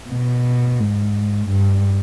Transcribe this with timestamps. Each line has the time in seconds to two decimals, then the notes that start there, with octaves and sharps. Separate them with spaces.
0.10 B2
0.79 G#2
1.48 G2